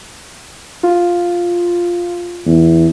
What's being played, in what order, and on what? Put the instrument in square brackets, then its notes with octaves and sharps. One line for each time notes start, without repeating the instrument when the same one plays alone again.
[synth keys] F4
[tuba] E2